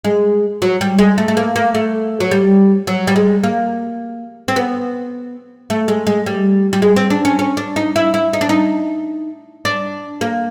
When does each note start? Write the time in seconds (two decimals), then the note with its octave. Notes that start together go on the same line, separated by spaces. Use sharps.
0.04 G#3
0.62 F#3
0.81 G3
0.99 G#3
1.18 A3
1.28 A3
1.37 A#3
1.56 A#3
1.75 A3
2.20 F#3
2.31 G3
2.87 F#3
3.07 G3
3.16 G#3
3.44 A#3
4.48 C4
4.56 B3
5.70 A3
5.88 G#3
6.07 G#3
6.26 G3
6.73 G3
6.82 G#3
6.96 C4
7.10 D4
7.25 C#4
7.39 C#4
7.57 D4
7.76 D#4
7.96 E4
8.14 E4
8.33 D#4
8.41 D4
8.49 D#4
9.65 D4
10.21 A#3